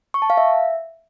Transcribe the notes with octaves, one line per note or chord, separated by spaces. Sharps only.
C#6
A5
F5
E5